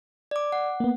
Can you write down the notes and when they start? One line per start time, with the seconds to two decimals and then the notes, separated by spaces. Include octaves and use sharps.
0.31 D5 D6
0.52 F#5
0.80 A#3 B3